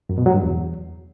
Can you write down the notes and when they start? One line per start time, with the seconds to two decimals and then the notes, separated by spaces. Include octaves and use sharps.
0.09 F#2
0.18 B2
0.26 F#3
0.34 G2
0.43 E2